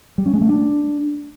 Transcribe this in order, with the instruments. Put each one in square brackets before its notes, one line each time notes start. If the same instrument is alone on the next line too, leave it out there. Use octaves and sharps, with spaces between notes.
[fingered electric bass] G3
C#4
G#3
A3
D4